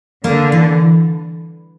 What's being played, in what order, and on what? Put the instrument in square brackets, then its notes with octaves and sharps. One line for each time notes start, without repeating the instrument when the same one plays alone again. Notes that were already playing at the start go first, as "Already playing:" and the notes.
[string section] D3 [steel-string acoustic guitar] A#3
[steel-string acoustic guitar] E3